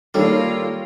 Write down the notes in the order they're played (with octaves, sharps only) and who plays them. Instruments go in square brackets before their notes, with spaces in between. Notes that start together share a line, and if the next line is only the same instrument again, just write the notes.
[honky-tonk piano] D#3 A4 C#5 [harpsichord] G3 [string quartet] A#3 F4